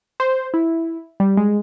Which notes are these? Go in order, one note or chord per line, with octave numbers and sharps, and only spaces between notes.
C5
E4
G3
G#3